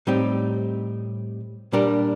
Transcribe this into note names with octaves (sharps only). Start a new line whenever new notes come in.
A2 G3 C4 D#4 G4
A#2 G3 D4 G4 A#4